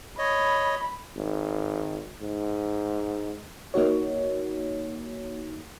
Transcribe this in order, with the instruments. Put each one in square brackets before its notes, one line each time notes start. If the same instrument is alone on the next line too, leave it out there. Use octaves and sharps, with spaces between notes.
[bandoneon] C#5 D#5 [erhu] B5
[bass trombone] G#1
G#2
[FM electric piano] A#3 D#4 F#4 C#5